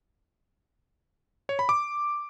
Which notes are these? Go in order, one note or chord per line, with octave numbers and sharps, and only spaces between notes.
C#5
B5
D6